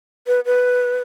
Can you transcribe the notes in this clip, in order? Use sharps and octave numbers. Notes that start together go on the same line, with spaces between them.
B4
B4